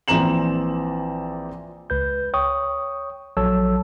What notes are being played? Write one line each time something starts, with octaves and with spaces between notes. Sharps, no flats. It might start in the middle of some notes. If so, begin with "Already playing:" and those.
A#1 E3 C4 A#5 E7 F#7
C#2 B4 G6
C#5 G5 C#6 D#6
A#1 F#3 A4 C#5 A5 E6